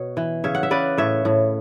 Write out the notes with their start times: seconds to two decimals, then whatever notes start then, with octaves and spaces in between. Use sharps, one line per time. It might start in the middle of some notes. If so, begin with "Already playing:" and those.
Already playing: B2 C#5
0.17 E3
0.44 C#3 C#5 E5
0.55 F#5
0.63 E5
0.71 C#3 B4 D5
0.98 A2 C#5 E5
1.25 A2